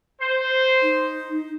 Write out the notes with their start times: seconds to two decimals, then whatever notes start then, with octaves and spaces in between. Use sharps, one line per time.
0.20 C5
0.82 D#4